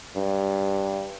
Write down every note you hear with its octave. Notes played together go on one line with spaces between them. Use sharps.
G2